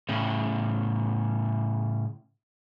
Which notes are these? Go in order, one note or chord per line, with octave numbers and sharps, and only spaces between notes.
A2 C#3